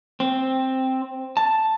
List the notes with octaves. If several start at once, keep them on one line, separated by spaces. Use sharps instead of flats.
C4
A5